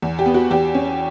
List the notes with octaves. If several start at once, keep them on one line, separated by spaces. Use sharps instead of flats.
E2
G4
B3
F#4
E2 G4
C#4